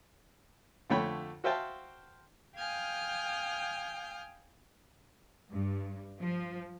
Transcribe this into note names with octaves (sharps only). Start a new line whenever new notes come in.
F2 D3 A3 C#5 G5 B5
F#4 C5 E5 F5 G5 A5
F5 G5 G#5 D#6 F6 G6
G2
F3